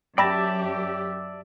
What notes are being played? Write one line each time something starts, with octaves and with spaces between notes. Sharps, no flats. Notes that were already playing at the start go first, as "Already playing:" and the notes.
F#2 G4 D5 E5 G5 A5 B5 A#6